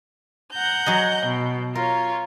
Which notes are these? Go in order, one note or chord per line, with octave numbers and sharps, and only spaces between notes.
F#5 A#5 G6
F#3 G#4 D#5
B2
F4 A#4 C#5